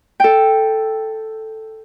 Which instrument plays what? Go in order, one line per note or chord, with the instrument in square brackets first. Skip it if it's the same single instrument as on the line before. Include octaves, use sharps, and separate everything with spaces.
[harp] A4 G5